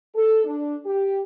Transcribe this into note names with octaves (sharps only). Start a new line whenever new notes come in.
A4
D4
G4